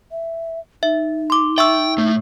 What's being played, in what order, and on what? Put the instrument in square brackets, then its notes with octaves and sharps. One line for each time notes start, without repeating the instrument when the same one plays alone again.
[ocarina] E5
[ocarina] D#4 [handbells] E5
[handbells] C6 D6
[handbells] E5 C#6 E6 [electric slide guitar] G5
[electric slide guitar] A2 A3